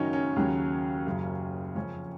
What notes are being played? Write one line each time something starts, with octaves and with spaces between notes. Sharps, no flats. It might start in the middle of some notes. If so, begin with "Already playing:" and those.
Already playing: F#1 F#2 D#3 F#3 C#4 D#4
C#4
D#2 C#3 F#3
F#1 F#2 C#3
F2 C#3 F3 C#4